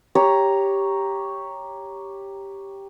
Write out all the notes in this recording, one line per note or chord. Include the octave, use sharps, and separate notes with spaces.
G4 C#5 A#5